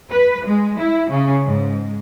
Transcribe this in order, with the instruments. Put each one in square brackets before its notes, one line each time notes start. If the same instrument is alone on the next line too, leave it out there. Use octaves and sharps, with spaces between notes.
[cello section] B4
G#3
E4
C#3
G#2